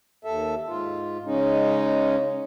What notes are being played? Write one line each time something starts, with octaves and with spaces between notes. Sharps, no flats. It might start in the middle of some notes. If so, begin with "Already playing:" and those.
D#2 A4 E5
G#2 F4
C#3 G#3 C#4 D#4